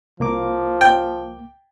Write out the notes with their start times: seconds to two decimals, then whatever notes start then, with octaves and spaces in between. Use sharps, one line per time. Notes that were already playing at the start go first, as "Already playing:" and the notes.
0.20 C2 F3 A#3 D6
0.81 G5